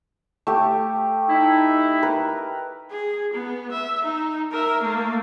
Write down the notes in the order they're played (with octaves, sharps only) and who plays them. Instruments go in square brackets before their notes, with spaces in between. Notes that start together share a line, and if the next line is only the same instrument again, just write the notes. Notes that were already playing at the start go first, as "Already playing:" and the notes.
[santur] A3 G4
[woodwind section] D#4 E4
[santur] A#4 B4
[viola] G#4
B3
E5
D#4
A#4 E5
A3 A#3